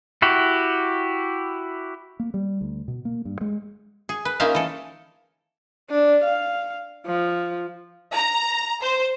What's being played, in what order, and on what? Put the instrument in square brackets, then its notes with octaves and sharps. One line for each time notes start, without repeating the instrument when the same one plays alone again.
[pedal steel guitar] E4 F#4 G4
[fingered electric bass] A#3
G3
D2
B2
A#3
G2
G#3
[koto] G#4
B4
A#3 C#4 D#4 F4 E5 F5
E3 A4
[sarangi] D4
F5
F3
[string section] A#5
C5